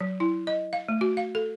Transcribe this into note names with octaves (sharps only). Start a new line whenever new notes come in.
F#3
E4
D#5
F5
A3
F#4
F5
A4